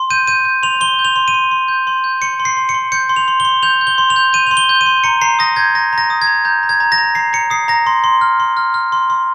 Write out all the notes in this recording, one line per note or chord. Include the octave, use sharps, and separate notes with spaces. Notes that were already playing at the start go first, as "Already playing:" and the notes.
Already playing: C6
G6 D#7
G6 D#7
G6
C6 F7
C6 G7
G6
F7
C6
D#7
C6
C6
G6
C6
G6
C6 C#7
C6
C7
C6
C#7
C6
G6 C#7
C6
F7
C6
C6 G7
G6 F7
G6
G7
C6
F7
G6
G6 D#7
C6 F7
G7
G6
D#7
C6
A#5 C#7
A#5 C7
D#6 A#6
G6 G#6
A#5 A#6
A#5 A#6
D#6
G#6
A#5
A#5 G6
A#5
G#6
A#5
A#6
A#5
A#5 C7
A#5 C#7
D#6 C7
A#5 A#6
C6
C6
F6
C6
F6
F6
C6
C6